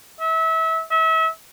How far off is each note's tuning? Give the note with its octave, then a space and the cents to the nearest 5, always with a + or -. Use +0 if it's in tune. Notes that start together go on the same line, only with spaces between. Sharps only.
E5 -25
E5 -35